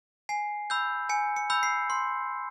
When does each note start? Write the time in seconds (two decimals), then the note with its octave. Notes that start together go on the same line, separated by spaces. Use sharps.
0.29 G#5 C7
0.70 B5 E6 G6
1.09 G#5 C#7
1.36 C#7
1.50 B5 E6 G6
1.63 C7
1.90 C6